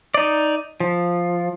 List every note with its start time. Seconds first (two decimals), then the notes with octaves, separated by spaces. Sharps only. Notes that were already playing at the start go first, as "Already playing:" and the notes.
0.14 D#4 D5
0.80 F3